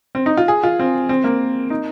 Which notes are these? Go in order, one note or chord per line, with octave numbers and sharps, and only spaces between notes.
C4
D#4
F4
G#4
F4
C4
C4
A#3
D#4